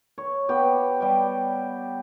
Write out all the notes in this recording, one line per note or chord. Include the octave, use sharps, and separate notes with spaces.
C#5
B3 G4
G3 G5